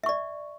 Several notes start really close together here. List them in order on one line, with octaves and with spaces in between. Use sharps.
E5 C#6 D5